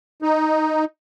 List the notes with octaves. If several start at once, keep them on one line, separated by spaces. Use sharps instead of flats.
D#4